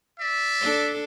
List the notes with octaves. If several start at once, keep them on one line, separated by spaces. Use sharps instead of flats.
D5 E5
D4 A4